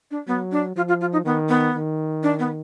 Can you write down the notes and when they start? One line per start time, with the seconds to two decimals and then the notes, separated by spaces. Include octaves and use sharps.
0.11 D4
0.27 F#3 B3
0.52 D4
0.76 F3 F4
0.88 F4
1.01 F4
1.12 D#4
1.25 D#3 B3
1.49 B3
1.74 D#3
2.23 D4
2.39 B3